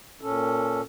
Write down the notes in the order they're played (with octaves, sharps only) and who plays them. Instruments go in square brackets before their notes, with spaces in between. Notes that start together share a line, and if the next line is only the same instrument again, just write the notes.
[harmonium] A#2 C#4 A4